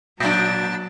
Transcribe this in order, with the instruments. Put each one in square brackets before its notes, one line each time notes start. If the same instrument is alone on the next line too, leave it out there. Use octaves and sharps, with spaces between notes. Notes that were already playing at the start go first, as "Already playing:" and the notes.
[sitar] A#2 D4 [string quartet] F#3 A6